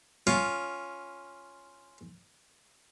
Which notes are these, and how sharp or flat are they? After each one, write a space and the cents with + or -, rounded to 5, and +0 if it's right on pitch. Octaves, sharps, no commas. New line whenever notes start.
C#4 +0 F4 +0